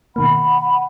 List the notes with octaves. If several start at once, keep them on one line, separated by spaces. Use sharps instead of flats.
B2 D#3 A#3 F#5 B5